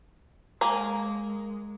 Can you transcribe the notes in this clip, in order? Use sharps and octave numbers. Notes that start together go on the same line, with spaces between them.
G#3 A#3 A#4 G#5